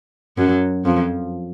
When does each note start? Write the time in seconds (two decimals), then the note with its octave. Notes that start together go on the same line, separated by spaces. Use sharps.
0.38 F#2 F#3
0.85 F2 F3